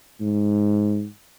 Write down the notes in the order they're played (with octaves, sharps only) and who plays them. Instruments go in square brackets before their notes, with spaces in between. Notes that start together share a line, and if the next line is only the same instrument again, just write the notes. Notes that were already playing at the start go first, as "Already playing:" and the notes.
[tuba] G#2